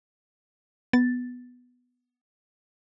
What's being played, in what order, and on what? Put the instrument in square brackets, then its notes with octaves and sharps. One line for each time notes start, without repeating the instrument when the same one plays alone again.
[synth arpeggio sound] B3 A6